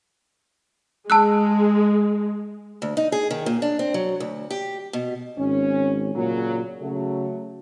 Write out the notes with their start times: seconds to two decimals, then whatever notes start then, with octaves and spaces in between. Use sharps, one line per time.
1.10 G#3 A5 E6 F#6
2.82 D2
2.97 D#4
3.12 G#4
3.30 D#3
3.46 A#2
3.62 D4
3.79 C4
3.94 F#3
4.20 D2
4.51 G4
4.93 B2
5.38 G#1 C#4
6.16 A#2 C#3 F#3
6.81 C#3 F#3 A3